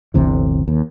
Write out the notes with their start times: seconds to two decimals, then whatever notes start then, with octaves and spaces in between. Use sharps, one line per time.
0.14 G1 D2 C3 E3
0.68 D#2